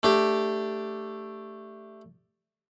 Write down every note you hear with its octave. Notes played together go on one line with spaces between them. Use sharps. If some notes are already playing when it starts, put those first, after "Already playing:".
A3 D4 G4